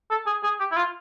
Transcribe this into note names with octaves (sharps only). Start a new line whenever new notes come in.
A4
G#4
G#4
G4
E4
F4